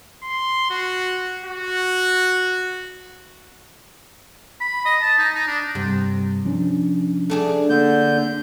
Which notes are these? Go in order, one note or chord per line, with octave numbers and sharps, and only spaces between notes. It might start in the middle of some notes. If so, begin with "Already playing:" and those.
C6
F#4
F#4
B5
D#5
A5
D#4
D#4
D4
G2 C3 G3
F3 C#4 D4
A3 D4 G#4
D3 A#3 G6